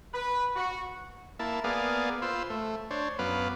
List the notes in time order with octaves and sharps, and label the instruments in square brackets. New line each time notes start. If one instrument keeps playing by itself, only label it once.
[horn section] B4
F#4
[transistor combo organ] A#3 E4 A5
A#3 B3 G#4 D5 F5
F4 B4 C5 E6
A3
D4 C5 C#5
F#2 B3 B4 F5 D6